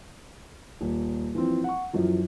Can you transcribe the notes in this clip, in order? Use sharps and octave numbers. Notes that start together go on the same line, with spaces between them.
D#1
E3 F3 C4
F#5 C#6
F#2 E3 F3